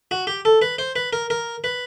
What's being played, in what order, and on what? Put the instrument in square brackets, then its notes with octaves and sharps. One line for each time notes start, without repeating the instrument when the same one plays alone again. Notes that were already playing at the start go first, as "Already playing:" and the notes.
[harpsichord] F#4
G4
A4
B4
C5
B4
A#4
A#4
B4